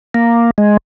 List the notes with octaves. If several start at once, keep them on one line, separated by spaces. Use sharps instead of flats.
A#3
G#3